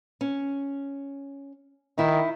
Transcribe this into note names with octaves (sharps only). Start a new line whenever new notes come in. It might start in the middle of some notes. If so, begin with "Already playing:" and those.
C#4
D#3 D#4 E4